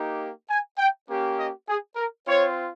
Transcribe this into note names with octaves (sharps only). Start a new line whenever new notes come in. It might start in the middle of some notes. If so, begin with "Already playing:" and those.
Already playing: A#3 D#4 G4
G#5
G5
A#3 C#4 G4
D#5
G#4
A#4
C4 F4 C#5